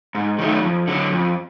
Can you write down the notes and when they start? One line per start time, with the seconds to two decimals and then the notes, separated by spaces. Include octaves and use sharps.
0.15 G#2
0.39 D#3 F#3 A3
0.63 F2
0.87 D3 F#3
1.12 F2